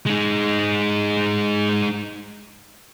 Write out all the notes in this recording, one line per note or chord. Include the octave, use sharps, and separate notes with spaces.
G#3 D#4